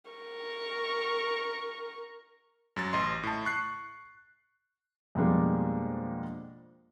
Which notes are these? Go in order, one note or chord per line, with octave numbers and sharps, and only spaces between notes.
A#4 C#6
F#2 F#3 A6
A1 D#5 C6
A2 A5
C#6 F#6 C7
F2 B2 G3 G#3 A#3 D4